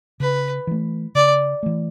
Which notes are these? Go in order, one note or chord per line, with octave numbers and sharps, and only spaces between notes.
C#3 B4
E3 A3
C#3 D5
E3 A3